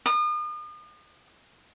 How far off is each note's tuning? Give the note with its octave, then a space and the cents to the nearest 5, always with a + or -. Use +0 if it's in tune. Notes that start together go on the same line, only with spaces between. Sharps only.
D#6 -40